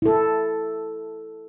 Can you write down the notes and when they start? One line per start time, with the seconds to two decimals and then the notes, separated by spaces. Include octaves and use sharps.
0.02 E4 A4